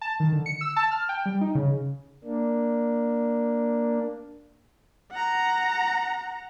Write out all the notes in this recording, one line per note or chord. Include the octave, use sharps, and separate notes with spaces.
A5
D#3
D3
C#7
E6
A5
F6
G5
G3
D#4
C#3
A#3 D4
F#5 A#5